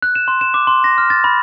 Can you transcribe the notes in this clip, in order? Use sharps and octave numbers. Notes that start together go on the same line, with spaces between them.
F#6
E7
C6
E7
D6
C6
A#6
F6
A6
B5